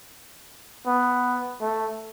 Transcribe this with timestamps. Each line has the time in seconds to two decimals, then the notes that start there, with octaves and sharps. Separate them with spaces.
0.86 B3
1.61 A3